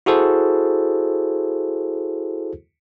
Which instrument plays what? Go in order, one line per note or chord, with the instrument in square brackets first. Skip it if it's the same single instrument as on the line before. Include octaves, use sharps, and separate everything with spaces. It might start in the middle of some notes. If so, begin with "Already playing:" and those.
[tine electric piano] E4 F#4 G#4 A4 C5